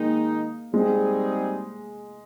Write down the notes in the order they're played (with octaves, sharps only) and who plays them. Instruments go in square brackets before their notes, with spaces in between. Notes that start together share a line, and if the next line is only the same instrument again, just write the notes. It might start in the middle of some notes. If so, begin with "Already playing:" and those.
Already playing: [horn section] D#3 G#3 D#4 [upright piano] A#3
[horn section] G3 C4 D#4 G#4 [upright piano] G#3